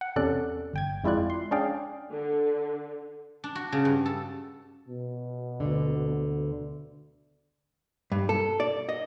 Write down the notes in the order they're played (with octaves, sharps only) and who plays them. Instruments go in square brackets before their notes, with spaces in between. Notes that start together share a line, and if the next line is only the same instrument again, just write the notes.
[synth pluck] F#5
E2 C3 C#4 A4 D5 F#6
G1 G5 G#6
F2 G#3 E4 F4 D5 F#6
C6
C#4 D4 G#4 D5 F5 G5
[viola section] D3
[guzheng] D4
F#4
C#3
G2
A4
[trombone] B2
[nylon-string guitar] D2 D3
[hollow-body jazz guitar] G2
A4
D5
D#5